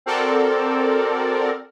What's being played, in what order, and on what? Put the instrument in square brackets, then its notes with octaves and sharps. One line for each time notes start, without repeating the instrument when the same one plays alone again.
[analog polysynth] C4 F#4 A4 A#4 D5